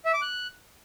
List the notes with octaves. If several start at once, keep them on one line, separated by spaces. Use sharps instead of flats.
E5
D6
F#6